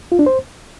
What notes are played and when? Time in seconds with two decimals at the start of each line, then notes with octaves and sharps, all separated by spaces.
0.12 F4
0.19 D4
0.26 C5